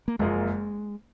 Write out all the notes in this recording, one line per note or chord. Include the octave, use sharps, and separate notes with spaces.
A#3
F#1 F#2 F3 G#3 A#3 F4